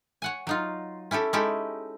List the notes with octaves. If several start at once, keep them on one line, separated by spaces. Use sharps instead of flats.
C#5 F#5 G#5
F#3 D#4 F4
C#4 E4 G4 A4
G#3 C#4 D#4 E4 G4 A4